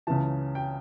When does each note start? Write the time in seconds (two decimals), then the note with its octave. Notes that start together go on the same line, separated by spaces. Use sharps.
0.07 C#2 C#3 E3 A5
0.55 G5